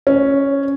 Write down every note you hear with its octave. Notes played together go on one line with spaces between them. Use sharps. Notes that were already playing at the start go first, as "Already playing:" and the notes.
C#4